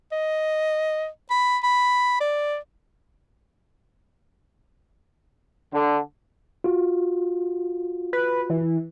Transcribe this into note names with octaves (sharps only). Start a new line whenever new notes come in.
D#5
B5
B5
D5
D3
F4 F#4
B4
E3